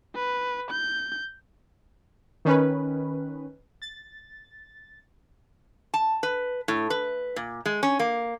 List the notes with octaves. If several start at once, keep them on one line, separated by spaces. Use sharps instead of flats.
B4
G6
D#3 C#4 B4
A6
A5
B4
A2
B4
A#2
G#3
C#4
A#3